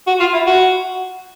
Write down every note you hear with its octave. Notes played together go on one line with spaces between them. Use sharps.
F#4
F4
E4
F#4